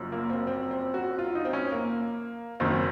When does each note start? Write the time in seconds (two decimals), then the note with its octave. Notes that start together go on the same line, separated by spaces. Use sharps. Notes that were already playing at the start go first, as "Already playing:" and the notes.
Already playing: F#1 F#2 F3
0.12 A#3
0.30 C4
0.47 C4
0.71 C4
0.94 F#4
1.19 F4
1.35 D#4
1.45 C4
1.53 C#4
1.72 A#3
2.60 F#1 F#2 D#3 C4